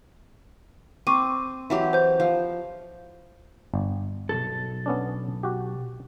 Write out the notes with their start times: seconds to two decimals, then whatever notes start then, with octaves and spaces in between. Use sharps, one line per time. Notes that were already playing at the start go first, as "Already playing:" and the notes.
1.07 C4 C#6 D6 D#7
1.70 E3 F#3 G4
1.93 C5 G6
2.20 F3
3.74 G1
4.29 B1 F2 A4
4.86 B3 C#4 D4
5.43 F#4 G4